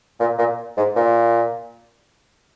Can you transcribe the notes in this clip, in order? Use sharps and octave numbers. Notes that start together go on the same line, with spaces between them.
A#2
A#2
G#2
A#2